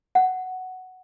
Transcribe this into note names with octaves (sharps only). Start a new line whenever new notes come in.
F#5